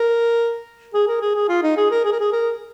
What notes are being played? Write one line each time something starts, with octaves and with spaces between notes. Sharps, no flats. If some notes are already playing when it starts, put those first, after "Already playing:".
Already playing: A#4
G#4
A#4
G#4
G#4
F4
D#4
G#4
A#4
G#4
A#4
G#4
A#4